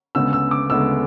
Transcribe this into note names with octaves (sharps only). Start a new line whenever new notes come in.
D2 C#3 G#3 B3 E6
E6
D6
D2 C#3 G#3 B3 E6